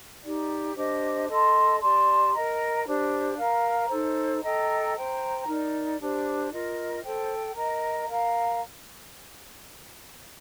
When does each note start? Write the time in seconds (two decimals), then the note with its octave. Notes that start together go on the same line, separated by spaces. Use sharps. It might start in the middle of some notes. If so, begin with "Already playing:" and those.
0.23 D#4 G4 D5
0.75 D4 G4 C5 D#5
1.27 A4 D#5 A5 C6
1.80 G4 D5 A5 C6
2.32 A#4 D#5 A#5
2.85 D4 G4 C5
3.38 A#4 F5 A#5
3.89 D#4 A4 C5
4.41 A4 D#5 G5 A#5
4.94 C5 G5 A#5
5.46 D#4 A#4 D5
5.99 D4 G4 C5
6.51 F4 A#4 D#5
7.03 A4 C5 G5
7.55 A#4 D#5 A#5
8.08 A#4 F5 A#5